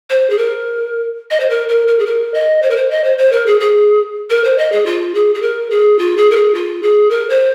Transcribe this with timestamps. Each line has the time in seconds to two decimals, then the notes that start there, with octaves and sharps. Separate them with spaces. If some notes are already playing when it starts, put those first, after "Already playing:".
0.10 C5
0.30 G#4
0.38 A#4
1.31 D#5
1.40 C5
1.50 A#4
1.69 A#4
1.87 A#4
1.99 G#4
2.06 A#4
2.34 D#5
2.62 C5
2.70 A#4
2.76 C5
2.90 D#5
3.04 C5
3.18 C5
3.32 A#4
3.46 G#4
3.60 G#4
4.30 A#4
4.44 C5
4.58 D#5
4.72 G#4
4.86 F4
5.15 G#4
5.35 G#4
5.42 A#4
5.70 G#4
5.99 F4
6.17 G#4
6.31 A#4
6.36 G#4
6.54 F4
6.83 G#4
7.10 A#4
7.30 C5